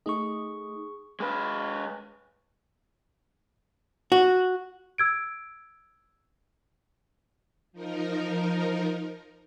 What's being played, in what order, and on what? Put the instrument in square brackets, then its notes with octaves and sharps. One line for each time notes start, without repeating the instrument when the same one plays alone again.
[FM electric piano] A3 D#4 [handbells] G#4 C#6
[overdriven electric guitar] G#3 B4
[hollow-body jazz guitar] F#4
[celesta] E6 G#6 D7
[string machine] F3 D#4 A#4